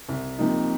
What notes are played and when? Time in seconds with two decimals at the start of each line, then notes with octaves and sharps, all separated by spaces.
0.09 C2
0.38 C3 F3 A#3 D#4